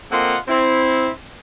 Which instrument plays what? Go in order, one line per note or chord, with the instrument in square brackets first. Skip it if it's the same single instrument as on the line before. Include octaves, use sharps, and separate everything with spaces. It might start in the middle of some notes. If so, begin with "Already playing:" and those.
[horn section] A#3 C4 F4 A4 D#5 F#5
C4 E4